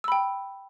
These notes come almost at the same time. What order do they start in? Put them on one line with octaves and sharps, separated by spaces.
E6 B5 G5